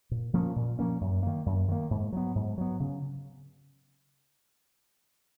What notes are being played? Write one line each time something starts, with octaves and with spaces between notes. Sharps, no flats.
A#2
F3 A#3 C#4
A#2
F3 A#3 C#4
F#2
D#3 A#3
F#2
D#3 A#3
G#2
F#3 B3
G#2
F#3 B3
C#3